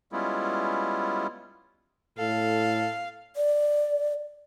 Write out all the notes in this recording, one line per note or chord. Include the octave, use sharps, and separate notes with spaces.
G3 G#3 B3 C#4 E4 F4
A2 A4 F5
D5